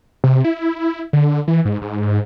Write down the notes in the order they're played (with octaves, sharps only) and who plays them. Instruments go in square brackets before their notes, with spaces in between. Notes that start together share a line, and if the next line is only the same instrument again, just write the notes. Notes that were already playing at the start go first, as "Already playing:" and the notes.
[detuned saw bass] C3
E4
D3
E3
G#2
G#2